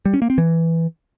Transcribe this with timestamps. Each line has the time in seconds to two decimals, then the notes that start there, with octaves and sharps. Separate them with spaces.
0.05 G3
0.14 C#4
0.22 A#3
0.30 C4
0.38 E3